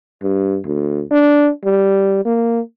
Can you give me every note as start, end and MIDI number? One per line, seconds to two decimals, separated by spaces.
0.23 0.57 43
0.65 1.02 38
1.11 1.50 62
1.65 2.22 55
2.25 2.60 58